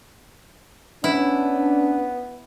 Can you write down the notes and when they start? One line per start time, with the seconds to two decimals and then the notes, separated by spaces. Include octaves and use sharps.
1.04 B3 C#4 D4 E4